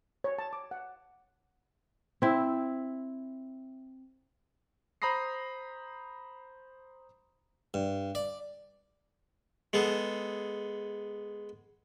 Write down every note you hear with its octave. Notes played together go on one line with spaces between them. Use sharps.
C#5
A5
D6
F#5
C4 E4
C5 A#5 B5 D#6 A#6 C7
G2
D5
G#3 B3 G#4 A4